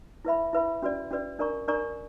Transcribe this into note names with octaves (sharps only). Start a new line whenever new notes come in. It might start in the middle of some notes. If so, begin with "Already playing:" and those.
E4 B4 E5 B5
E4 B4 E5 B5
C#4 F#4 B4 D5
C#4 F#4 B4 D5
D4 A#4 D5 A#5 C#6
D4 A#4 D5 A#5 C#6